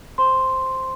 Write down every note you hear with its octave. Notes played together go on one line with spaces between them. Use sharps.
C5 C6